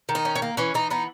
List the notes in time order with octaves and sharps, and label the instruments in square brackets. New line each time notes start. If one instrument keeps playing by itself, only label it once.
[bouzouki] D#3
D#4
C#4
C#4
A#3
E3 C#4
E3 D#4
B3 D#4